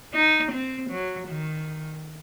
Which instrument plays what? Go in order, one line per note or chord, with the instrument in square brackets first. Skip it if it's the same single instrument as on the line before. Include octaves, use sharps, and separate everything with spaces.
[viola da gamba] D#4
C4
F#3
D#3